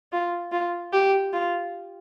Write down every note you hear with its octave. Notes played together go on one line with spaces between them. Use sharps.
F4
F4
G4
F4